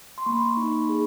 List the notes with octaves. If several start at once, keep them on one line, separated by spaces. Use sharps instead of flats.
C6
A#3 B5 C#6
D#4
G#4